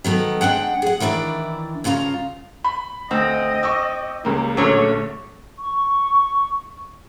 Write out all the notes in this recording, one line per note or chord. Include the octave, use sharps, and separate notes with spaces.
D#3 F#3 B3 A4
G#3 D4 F#5 G5
G#4 F#5
D#3 E3 D4 E4 D5
G2 C#3 F4 G#5 A#5
B5
D2 C4 D#5
C#6 D6 E6
C#2 G3 A#3
A#1 D3 F#3 A3 C#4 C#5
C#6